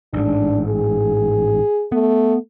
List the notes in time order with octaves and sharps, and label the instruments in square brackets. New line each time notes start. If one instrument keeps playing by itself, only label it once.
[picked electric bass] A1 G#2 [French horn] D4
[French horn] G#4
[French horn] A3 [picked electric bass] B3